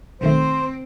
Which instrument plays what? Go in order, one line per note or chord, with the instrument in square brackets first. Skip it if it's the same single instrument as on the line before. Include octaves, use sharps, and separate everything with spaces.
[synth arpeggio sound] B1 D#3 A3 [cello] C4 [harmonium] C5